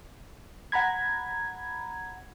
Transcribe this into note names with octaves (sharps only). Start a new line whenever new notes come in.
F#5 A#5 B5 G#6